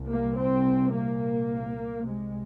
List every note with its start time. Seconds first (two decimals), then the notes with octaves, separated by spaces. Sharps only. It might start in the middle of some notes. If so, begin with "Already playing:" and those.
Already playing: C2 A#2
0.10 A#3
0.37 C4
0.94 A#3
2.07 C2 C3 G#3